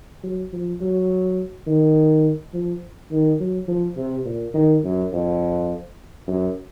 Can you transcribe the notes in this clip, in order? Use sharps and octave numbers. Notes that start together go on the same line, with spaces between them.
F#3
F3
F#3
D#3
F3
D#3
F#3
F3
C3
A#2
D#3
F#2
F2
F#2